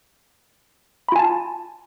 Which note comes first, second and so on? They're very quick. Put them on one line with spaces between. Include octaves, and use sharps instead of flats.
B5 F4 G#5 A5